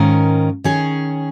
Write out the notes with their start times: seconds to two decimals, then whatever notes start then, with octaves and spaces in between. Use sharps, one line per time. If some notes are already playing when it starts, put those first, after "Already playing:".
Already playing: G#2 D#3 C#4 F4 A#4
0.64 D#3 C#4 G#4 C#5